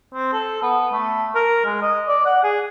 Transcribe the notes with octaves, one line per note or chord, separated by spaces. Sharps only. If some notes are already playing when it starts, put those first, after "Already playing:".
C4
A4
B3
A3
A#4
G#3
D#5
D5
F#5
G#4